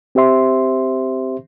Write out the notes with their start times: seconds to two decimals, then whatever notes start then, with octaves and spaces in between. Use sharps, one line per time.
0.15 C4 G4 C5 E5 C6